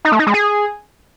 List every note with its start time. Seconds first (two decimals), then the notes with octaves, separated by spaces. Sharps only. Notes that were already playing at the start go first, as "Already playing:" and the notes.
0.05 D#4
0.12 A3
0.19 D#4
0.27 G#3
0.34 G#4